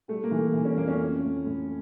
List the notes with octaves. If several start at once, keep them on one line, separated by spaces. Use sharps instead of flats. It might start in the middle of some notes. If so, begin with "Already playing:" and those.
G3 A3
A#3
E3
A3
E3
C#4
F2 A#3
C#4
A2
A2
A2